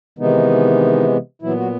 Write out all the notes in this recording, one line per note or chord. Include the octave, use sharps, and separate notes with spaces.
C3 D#3 E3 G#3 B3 D#4
A#2 E3 F#3 B3 E4
F#3 F#4